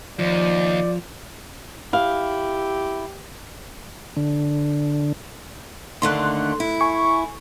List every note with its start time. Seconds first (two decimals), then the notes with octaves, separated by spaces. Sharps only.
0.19 D#2 F3 D5
1.93 E4 G4 F5
4.17 D3
6.02 D#2 D3 A3 C6 F#6
6.60 E4
6.81 G#5 C#6